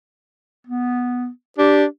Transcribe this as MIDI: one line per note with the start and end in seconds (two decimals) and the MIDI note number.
0.67 1.28 59
1.58 1.85 62
1.58 1.85 67